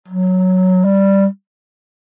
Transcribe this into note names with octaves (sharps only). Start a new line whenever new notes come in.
F#3
G3